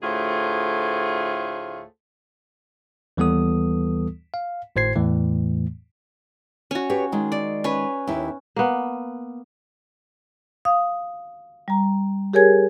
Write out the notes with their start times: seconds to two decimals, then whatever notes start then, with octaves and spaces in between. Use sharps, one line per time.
0.03 D2 A2 A3 F4 G#4 C5
3.17 D#2 E3 G3 B3 A4 D#6
4.34 F5
4.76 G#1 A2 C5 G#6 C7
4.96 E2 A2 E3 A3
6.71 C#4 F#4
6.89 G4 B4 C#5
7.12 D#3 G#3
7.32 D5
7.64 C#4 B4
8.07 D#2 E4
8.56 A#3 B3
10.65 F5 D#6
11.68 G3 A#5
12.33 G4 G#4 A#4 C#5 G#5 G#6